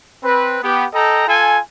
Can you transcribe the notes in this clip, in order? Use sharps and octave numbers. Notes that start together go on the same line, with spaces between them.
C4 B4
B3 G4
A4 D#5 G5 A#5
F4 A4 G#5